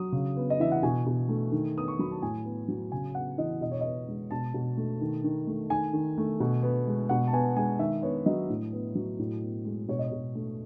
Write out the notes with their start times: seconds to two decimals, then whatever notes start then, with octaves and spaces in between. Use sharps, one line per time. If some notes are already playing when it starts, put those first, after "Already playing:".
Already playing: F#3 D#6
0.12 C#3
0.37 B3
0.50 D#5
0.60 E3 E5
0.72 F#5
0.83 B2 G#5
1.06 B2
1.29 A3
1.52 D#3
1.76 B3 D#6
1.88 C#6
1.99 F#3 B5
2.11 A5
2.22 A2 G#5
2.45 B3
2.68 F#3
2.92 C#3 G#5
3.15 B3 F#5
3.38 E3 D#5
3.61 B2 D#5
3.71 C#5
3.81 B3 D#5
4.08 G#3
4.31 B2 A5
4.54 B2
4.77 A3
5.01 D#3
5.24 D#3
5.47 A3
5.70 D#3 G#5
5.93 D#3
6.18 A3
6.40 B2
6.63 B3
6.87 G#3
7.09 B2 F#5
7.27 A5
7.33 B3 G#5
7.56 G#3 G#5
7.79 D#3 E5
8.02 B3 C#5
8.26 F#3 D#5
8.50 A2
8.73 B3
8.95 F#3
9.19 A2
9.43 B3
9.65 G#3
9.88 B2 C#5
9.99 D#5
10.08 B2 C#5
10.35 A3